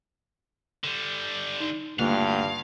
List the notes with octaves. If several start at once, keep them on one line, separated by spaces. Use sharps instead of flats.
D3 G3
D#4
D2 G2 A#3 F4 F5